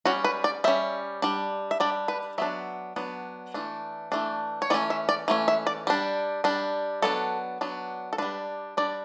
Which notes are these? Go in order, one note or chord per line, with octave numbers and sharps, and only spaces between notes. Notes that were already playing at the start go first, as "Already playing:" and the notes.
G3 C#4 F#4
B4
D5
G3 C#4 E5
G3 D4
E5
G3 D4 D5
B4
F#3 B3 D4 E5
F#3 B3 D4
E3 A3 D4
E3 A3 D4
C#5
E3 A3 C#4 D5
E5
D5
E3 A3 C#4
E5
D5
G3 D4
G3 D4
F#3 B3 D4 A4
F#3 B3 D4
A4
G3 D4 B4
G3 D4 D5